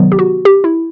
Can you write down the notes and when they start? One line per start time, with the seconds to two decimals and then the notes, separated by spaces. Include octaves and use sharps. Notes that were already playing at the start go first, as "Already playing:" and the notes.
Already playing: C3 D#3 F#3 B3
0.12 G4
0.19 F#4
0.45 G4
0.64 E4